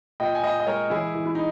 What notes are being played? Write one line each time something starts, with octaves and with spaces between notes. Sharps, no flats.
A#2 D#5 G5
G#5
A#2 D#5 G5
D#5
G#3 A#4 C#5
E3 E4 G#4
E3
E4
D#4